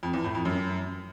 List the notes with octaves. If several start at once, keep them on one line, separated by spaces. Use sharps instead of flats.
F2
E2
A2
F2
F#2